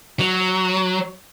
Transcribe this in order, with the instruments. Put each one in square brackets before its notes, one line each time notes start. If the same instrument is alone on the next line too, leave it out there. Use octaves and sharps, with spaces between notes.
[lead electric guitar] F#3